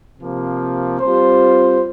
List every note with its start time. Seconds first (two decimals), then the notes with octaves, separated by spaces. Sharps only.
0.18 C3 F3 A#3
0.99 G3 C4 F4 C5